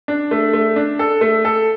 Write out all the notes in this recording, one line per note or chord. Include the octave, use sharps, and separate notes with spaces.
D4
A3
A3
D4
A4
A3
A4